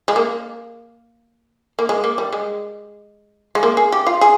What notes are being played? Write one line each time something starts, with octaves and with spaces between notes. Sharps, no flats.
G#3
A#3
A#3
G#3
A#3
G3
G#3
G#3
A#3
G#4
G4
F4
G#4